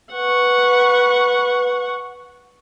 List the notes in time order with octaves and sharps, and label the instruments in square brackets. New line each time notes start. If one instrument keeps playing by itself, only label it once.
[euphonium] B4 [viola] F#5 C#6